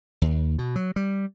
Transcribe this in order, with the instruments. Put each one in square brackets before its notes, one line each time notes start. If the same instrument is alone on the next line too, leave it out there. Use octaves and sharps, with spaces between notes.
[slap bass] D#2
B2
F#3
G3